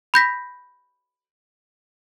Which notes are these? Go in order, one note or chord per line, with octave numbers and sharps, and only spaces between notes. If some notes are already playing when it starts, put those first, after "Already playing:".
B5 G6 A#6 B6